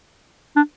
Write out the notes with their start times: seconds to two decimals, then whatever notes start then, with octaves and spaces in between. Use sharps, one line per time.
0.56 D4